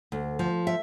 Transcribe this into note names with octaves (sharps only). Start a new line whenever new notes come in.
D2
F3
E5